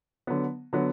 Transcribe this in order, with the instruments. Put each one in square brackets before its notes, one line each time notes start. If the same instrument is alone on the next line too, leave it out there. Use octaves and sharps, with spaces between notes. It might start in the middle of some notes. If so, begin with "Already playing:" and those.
[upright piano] D3 F#3 B3
D3 F#3 B3